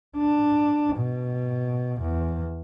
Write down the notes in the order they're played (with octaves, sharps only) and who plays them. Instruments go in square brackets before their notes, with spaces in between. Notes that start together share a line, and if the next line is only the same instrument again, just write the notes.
[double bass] D4
B2
E2